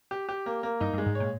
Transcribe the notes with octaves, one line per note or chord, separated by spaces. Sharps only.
G4
G4
A#3
A#3
G2 D#4
G2
G#3
G#2
C#5
A#2